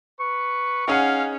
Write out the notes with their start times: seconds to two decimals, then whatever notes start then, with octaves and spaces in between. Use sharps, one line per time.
0.20 B4 C#6
0.87 C#4 D#4 G#4 F5 F#5